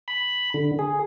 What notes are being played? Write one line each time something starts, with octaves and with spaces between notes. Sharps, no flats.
B5
D3
G#4